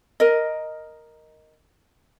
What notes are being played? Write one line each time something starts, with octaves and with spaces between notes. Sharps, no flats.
A#4 D#5